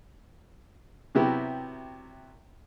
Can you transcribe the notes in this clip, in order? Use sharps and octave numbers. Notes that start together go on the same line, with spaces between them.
C3 F#3 B3 E4 F#4 G4